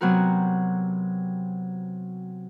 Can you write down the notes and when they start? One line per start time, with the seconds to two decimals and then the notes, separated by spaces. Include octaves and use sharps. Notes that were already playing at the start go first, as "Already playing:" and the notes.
0.01 C3 F#3 B3 C4 F#4 A#4